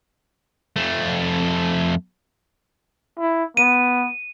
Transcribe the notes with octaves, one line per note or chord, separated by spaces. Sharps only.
F2 A3
E4
B3 D#7